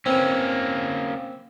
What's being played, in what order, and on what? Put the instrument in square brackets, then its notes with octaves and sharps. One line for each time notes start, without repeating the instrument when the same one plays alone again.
[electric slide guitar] A#3 C#4 [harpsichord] C4 B4